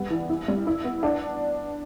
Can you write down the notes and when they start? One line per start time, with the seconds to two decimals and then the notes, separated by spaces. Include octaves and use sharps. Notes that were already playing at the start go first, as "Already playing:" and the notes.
Already playing: G3 B3
0.10 E3
0.30 E4
0.48 G3
0.67 E4
0.84 B3
1.03 D4